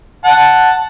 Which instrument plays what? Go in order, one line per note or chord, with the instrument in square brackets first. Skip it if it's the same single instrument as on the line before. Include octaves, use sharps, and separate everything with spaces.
[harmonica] F#5 A5